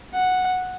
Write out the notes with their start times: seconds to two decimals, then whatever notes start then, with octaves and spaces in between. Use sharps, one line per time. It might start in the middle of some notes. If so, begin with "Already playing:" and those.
0.14 F#5